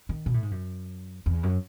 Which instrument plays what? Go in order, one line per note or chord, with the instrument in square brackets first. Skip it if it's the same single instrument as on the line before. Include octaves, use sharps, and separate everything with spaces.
[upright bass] D#3
B2
A2
G#2
F#2
E2
F#2